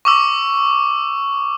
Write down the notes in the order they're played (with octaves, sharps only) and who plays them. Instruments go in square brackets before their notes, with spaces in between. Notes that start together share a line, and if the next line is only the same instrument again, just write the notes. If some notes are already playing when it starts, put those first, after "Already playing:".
[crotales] C#6 D6 E6